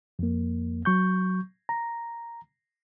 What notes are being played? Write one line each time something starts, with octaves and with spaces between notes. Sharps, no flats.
F2 A#3
F#3 C#6 G6
A#5